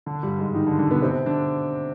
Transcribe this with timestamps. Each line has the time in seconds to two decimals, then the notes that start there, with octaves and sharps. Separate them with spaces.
0.06 D3 D4
0.23 G2 G3
0.39 G#2 G#3
0.55 D#3 D#4
0.67 D3 D4
0.79 D3 D4
0.91 B2 B3
1.02 C3 C4
1.26 D3 D4